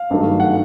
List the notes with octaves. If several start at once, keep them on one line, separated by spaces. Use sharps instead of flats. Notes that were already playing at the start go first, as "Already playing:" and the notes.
Already playing: F5
G#1 G2 D#3 F#3 A3
F#5